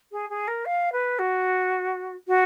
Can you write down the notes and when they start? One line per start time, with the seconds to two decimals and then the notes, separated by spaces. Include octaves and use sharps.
0.12 G#4
0.30 G#4
0.48 A#4
0.66 F5
0.92 B4
1.19 F#4
2.28 F#4